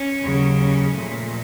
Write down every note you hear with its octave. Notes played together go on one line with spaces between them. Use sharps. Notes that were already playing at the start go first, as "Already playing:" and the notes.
Already playing: C#4
D#2 C#3 F#3
C#4
A#2 F3 A3